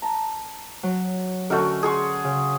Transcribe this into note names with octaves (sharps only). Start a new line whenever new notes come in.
A5 A#5
F#3
D3 A3 C#4 F#4 A#4 F6
G#4 C6 C#6
C#3